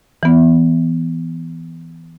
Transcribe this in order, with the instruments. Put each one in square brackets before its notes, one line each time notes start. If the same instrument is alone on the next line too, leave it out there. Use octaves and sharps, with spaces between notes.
[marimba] E3 B3